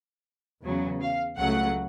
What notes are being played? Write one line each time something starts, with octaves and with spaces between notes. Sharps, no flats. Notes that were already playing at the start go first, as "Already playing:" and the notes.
E2 C#3 F#3
F5
C#2 C#3 F#3 A3 F#5